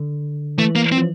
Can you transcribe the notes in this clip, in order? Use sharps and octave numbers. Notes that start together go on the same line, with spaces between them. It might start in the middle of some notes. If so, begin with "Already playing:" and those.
Already playing: D3
E3 A3
A#3
C4
F3